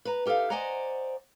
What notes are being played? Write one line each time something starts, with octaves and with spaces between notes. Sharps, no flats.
B4 A#5
D#4 G4 A4 E5 F5
C5 D5 D#5 F#5 G#5 A#5